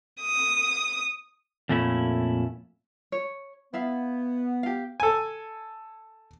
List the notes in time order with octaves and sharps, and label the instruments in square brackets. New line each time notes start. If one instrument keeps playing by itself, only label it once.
[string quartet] D#6
[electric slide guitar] F2 A#2 A3 C#4 E4
[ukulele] C#5
[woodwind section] B3 [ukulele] E4 E5 F5
[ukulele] G4 F5
[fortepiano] A4 G#5